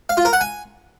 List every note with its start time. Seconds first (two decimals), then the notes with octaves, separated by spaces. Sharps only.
0.09 F5
0.17 F4
0.25 A#4
0.33 F#5
0.41 G#5